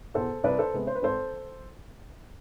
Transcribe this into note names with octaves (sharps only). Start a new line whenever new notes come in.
E2 B2 A4 C5
C2 B4 D5
A4 C5
C3 G#3 B3
C5
B4
G#1 A4 C5